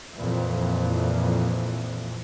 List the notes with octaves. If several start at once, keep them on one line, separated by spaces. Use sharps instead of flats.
F2 A#2 E3